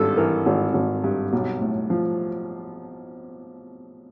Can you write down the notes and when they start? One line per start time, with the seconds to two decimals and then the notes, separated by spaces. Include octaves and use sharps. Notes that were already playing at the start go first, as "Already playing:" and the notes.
Already playing: G#1 G2 A4
0.17 E3 A#4
0.46 G#1
0.74 G#1
1.04 G2
1.33 B1
1.61 A2
1.90 F3